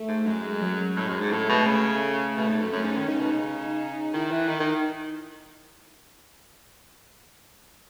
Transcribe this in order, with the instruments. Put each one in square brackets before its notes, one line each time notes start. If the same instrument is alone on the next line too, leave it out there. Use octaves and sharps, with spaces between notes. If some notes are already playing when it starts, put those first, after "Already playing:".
Already playing: [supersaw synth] A3
[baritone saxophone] G#2
[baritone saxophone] F#2 [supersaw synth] G#3
[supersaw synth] F#3
[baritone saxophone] A2 [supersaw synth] G#3
[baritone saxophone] F#2
G#2
[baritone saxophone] A2 [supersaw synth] A3
[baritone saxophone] B2
C#3
[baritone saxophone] B2 [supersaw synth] A3
[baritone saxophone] G#2
F#2
[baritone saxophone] F#2 [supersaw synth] C#4
[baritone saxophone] G#2
D#3
[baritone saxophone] C#3 [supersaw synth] D#4
[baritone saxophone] B2
C#3
[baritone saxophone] D#3 [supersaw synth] E4
[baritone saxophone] E3
[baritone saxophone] D#3 [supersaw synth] D#4
[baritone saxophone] D#3